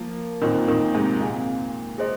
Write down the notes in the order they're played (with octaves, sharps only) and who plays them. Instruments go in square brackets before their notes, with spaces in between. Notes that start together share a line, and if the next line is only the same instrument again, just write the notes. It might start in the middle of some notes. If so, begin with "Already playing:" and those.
Already playing: [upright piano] F3 A#3
[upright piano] A#2 D#3 [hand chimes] C4 F4 C5
[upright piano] A#2 D#3
G#2 C3
[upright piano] A#2 [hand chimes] C4 G#4 F5 G#5
[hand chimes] G#4 C5 D#5